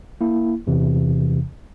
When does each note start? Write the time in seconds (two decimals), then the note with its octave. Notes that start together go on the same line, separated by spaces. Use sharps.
0.21 A#3 E4
0.67 E2 C3 E3